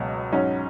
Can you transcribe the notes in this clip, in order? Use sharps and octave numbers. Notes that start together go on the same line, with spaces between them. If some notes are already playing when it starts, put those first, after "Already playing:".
Already playing: C#2 B2 F#3
G#2 F#3 C#4 F#4